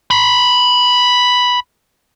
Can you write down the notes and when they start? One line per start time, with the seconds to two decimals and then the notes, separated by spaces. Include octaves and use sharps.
0.11 A#5 B5